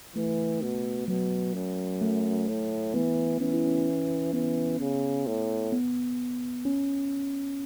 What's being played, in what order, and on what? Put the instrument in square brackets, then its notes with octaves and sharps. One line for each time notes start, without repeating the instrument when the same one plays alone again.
[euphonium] E3 [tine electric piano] A3
[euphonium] B2
[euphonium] B2 [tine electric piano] F#3
[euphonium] F#2
[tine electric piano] A3
[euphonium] A2
[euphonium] E3 [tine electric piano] B3
[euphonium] E3 [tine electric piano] C#4
[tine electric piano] E4
C#4
[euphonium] E3 [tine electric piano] B3
[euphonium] C#3
A2
[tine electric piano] B3
C#4